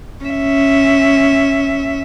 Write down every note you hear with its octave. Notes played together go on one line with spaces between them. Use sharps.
C#4 E5